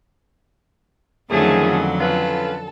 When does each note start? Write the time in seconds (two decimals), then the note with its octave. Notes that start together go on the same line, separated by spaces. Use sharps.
1.31 F2 D3 D#3 F3 F#3 A3 C#4 G#4
2.00 C#4 F4 A4 B4